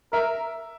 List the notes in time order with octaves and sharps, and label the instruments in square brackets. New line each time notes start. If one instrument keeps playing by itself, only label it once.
[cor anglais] A#4 [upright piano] E5